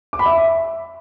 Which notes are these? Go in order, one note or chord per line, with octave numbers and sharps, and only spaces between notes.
D6
B5
E5